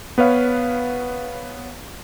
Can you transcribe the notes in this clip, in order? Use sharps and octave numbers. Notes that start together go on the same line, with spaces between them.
B3 B4 C#5 F5